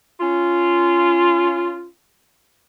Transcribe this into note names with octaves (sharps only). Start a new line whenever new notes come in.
C#4 F4